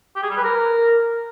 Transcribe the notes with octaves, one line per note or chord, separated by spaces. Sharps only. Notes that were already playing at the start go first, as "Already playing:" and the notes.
G4
G#4
G3
B4
A#4